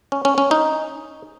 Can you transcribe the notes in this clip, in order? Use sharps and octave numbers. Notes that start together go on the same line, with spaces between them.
C#4
C#4
C#4
D#4